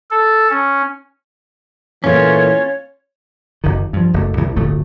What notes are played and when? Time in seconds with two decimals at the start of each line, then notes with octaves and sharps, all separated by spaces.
0.11 A4
0.50 C#4
2.04 A#2 E3 A3 A#3 C#4 F4 C#5
3.64 F#1 D#3
3.93 G2 F3
4.14 F#1 A3
4.37 C2
4.56 D1 G1 A3